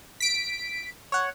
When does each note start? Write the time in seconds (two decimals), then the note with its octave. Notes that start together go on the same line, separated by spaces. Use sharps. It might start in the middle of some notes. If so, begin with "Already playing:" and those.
0.20 B6 D7
1.12 C#5 F#5